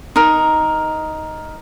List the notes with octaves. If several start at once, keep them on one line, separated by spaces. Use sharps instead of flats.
D#4 A#4